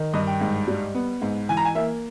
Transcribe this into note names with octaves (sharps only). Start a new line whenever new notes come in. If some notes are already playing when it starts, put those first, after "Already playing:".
Already playing: D#3
G2 D#5
G5
G#2
G3
B3
G#2
E3 G#5
A#5
G#5
A#3 E5